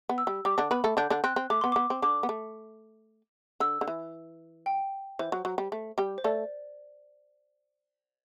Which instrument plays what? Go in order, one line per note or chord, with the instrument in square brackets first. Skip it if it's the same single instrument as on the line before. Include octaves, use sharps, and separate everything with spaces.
[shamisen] B3
[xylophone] E6
[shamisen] G3
[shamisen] G3 [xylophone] D6
[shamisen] D3 D4
[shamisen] B3 B4 [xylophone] B5
[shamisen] A3 A4
[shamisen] D3 D4 [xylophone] G6
[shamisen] D3 D4
[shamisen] C4 [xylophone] F#6
[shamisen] C4
[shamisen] A3 [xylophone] D6
[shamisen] B3 [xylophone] C6
[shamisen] B3 [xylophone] D6
[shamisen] C4
[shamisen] D3 D4 [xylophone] D6
[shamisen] B3
A3
[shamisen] D3 [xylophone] E6
[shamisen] D3
E3
[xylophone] G5
[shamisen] E3 [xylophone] C5
[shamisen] F#3
F#3
G3
A3
G3 G4
[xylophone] C5
[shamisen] A3 A4 [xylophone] D5